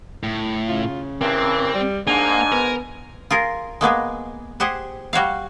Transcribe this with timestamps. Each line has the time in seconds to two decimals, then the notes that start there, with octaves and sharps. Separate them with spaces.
0.23 A2
0.68 C#3 F4
1.21 G2 E3 C4 A#4
1.74 G3
2.07 G#2 A#3 D4 G#5
2.52 B3 A#4
3.30 F4 G#4 A#4
3.81 G#3 A#3 B3 G#4
4.60 G4 G#4 C5 F#5
5.13 G3 F#4 C#5 F5